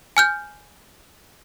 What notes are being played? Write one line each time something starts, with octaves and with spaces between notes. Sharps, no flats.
G#5 F6 G6